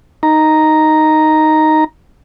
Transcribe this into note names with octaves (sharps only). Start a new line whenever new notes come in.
D#4 A#5